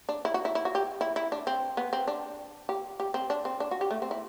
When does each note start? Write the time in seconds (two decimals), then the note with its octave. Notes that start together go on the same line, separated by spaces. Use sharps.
0.09 D4
0.25 E4
0.34 F#4
0.45 E4
0.55 E4
0.65 F#4
0.75 G4
1.01 E4
1.16 E4
1.32 D4
1.47 C4
1.77 B3
1.93 C4
2.08 D4
2.69 G4
3.00 G4
3.14 C4
3.30 D4
3.45 C4
3.60 D4
3.71 F#4
3.81 G4
3.91 A3
4.02 C4
4.11 E4